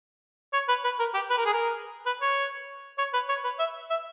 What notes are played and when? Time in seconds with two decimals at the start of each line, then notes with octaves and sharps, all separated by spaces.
0.53 C#5
0.69 B4
0.84 B4
0.99 A#4
1.14 G4
1.30 B4
1.38 A#4
1.46 G#4
1.53 A#4
2.06 B4
2.22 C#5
2.98 C#5
3.14 B4
3.29 C#5
3.44 B4
3.59 E5
3.90 E5